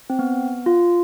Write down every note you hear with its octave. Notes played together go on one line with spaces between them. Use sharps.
C4
B3
F4